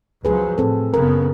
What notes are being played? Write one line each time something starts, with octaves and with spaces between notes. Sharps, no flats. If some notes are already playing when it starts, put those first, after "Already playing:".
C#2 F3 F#3 G#4 B4
A2 C4 A4
F#1 C#3 B3 A#4